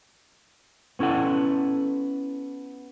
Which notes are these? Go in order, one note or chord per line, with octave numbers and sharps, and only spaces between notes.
B3 C#4 E4 A4 F#5